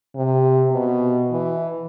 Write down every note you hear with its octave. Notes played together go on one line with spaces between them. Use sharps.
C3
B2
E3